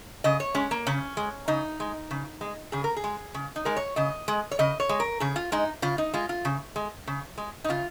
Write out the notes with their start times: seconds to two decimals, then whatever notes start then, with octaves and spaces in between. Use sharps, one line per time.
0.24 C#3 D#5
0.40 C#5
0.55 G#3 C#4
0.71 A#3
0.87 C#3 C#4
1.17 G#3
1.48 C#3 D#4
1.80 G#3
2.11 C#3
2.41 G#3
2.72 C#3 G#4
2.84 A#4
2.96 G#4
3.04 G#3
3.34 C#3
3.56 D#4
3.65 G#3 A#4
3.76 C#5
3.96 C#3 D#5
4.28 G#3
4.51 C#5
4.59 C#3 D#5
4.80 C#5
4.89 G#3
5.00 A#4
5.20 C#3 G#4
5.36 F4
5.52 G#3 D#4
5.82 C#3 F4
5.98 D#4
6.14 G#3 F4
6.29 F4
6.45 C#3
6.76 G#3
7.07 C#3
7.38 G#3
7.64 D#4
7.69 C#3 F4